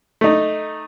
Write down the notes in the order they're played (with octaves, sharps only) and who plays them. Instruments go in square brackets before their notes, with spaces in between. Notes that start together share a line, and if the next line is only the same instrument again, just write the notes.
[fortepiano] A3 D#4